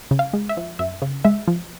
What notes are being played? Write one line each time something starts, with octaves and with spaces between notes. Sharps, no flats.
C#3
F5
G#3
E5
F3
F#2 E5
C#3
G#3 E5
F3